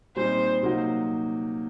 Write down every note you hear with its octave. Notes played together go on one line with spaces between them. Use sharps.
A#2 G3 C4 D#4 C5
C3 F#3 A#3 D#4 F#4